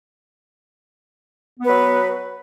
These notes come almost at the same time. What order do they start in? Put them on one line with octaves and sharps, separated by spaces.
B3 B4 F#3